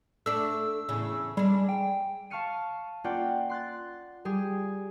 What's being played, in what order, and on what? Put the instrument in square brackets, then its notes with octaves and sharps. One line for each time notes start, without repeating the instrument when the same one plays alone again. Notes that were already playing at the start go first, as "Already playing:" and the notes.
[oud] A3 D4 [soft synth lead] E6
[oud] E2 A2 C#3
[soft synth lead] G3 [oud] G#3 D4
[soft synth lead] G5
[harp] F5 A5 C#6 F6 C#7 D#7
A#3 C#4 F4 D5 F#5 G5
C6 F#6 A6
G3 G4 G#4